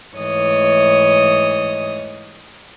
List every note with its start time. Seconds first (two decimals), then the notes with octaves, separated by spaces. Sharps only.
0.17 G#2 E3 A3 C#5 D#5 D#6